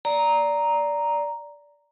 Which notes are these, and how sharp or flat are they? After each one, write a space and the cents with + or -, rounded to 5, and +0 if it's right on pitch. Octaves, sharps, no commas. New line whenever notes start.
D5 -10 A#5 +0